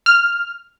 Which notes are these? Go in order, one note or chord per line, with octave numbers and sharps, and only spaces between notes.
F6